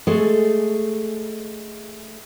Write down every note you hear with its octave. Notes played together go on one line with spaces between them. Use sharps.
G#3 A3 G#4 A4